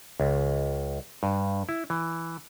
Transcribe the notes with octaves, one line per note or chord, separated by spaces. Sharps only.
C#2
G2
E4
E3